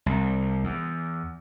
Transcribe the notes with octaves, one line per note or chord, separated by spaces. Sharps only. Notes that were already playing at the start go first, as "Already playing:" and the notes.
C2
E2